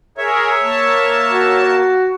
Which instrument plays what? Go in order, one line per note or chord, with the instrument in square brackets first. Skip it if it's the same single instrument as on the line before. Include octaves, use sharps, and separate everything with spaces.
[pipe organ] G#4 A#4 [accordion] C#5 E5
[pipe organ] A#3 A5
[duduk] F#4